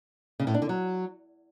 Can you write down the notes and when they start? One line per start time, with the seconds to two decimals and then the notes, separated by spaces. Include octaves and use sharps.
0.40 C#3
0.47 A2
0.54 D4
0.62 D3
0.69 F#3